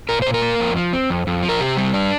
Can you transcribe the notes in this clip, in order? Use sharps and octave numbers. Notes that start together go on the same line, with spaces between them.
A#2 A#4
A#2 C5
A#4
A#3
F2
F3
C4
F2
F2
F3
A#4
C3 G4
G3
D4